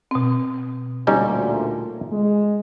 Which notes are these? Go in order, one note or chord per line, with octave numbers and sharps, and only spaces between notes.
B2 C4
D2 A#2 G3 C#4 D#4
G#3